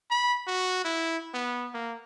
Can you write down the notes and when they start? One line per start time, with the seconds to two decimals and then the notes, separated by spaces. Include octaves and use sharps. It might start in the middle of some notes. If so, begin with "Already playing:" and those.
0.10 B5
0.47 F#4
0.84 E4
1.34 B3
1.74 A#3